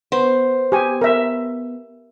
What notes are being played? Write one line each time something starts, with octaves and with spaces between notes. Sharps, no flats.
B3 C5
G4 G#5
A#4 E5